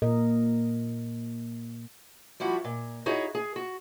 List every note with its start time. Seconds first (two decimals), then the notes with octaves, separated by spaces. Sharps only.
0.02 A#2 A#4 D#5
2.40 F3 G3 E4 F#4
2.64 A#2
3.06 D#4 E4 F#4 G#4 C#5
3.35 G#4
3.56 F#4